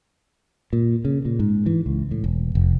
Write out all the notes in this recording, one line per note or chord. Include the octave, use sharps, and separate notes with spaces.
A#2
C#3
A#2
G#2
E3
C#2
A2
E1
F1